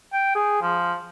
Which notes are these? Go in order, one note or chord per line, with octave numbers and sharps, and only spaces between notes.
G5
G#4
F3